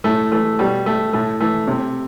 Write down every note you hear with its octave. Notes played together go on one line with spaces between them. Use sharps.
A2 A3
E3 A3
B2 G3
A3
A2 A3
E3 A3
C3